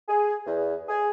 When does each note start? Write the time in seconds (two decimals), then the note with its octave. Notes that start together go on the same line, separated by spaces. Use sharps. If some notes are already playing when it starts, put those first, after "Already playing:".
0.08 G#4
0.46 E2
0.88 G#4